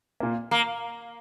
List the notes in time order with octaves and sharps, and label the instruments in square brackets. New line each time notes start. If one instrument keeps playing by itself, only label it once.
[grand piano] A#2 A#3
[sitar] A#3